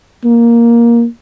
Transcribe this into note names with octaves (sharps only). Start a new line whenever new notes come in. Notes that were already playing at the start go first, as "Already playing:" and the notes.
A#3